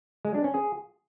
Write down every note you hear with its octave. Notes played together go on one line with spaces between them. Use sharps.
G#3
D4
C#4
G#4